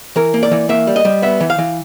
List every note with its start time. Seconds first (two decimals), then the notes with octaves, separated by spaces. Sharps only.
0.16 E3 A#4
0.34 A#3
0.43 D5
0.51 E3
0.69 A#3 E5
0.87 G3
0.96 D#5
1.05 G3
1.22 B3 E5
1.40 E3
1.50 F5
1.58 E3